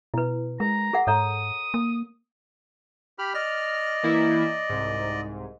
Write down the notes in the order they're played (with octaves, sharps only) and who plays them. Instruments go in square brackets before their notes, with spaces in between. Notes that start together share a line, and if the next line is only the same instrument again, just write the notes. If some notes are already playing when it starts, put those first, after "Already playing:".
[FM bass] B2 [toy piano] E4 B4
[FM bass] G#3 [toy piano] A#4 [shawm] A#5
[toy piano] G#4 A#4 F#5
[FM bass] G#2 [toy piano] A4 C#5 A#5 [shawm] D#6
[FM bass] A#3
[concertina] G4 B5 F6
[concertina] D5 D#5 [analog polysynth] F6
[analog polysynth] E3 A#3 E4
C2 G#2